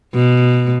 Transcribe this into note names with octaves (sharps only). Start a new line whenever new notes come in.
B2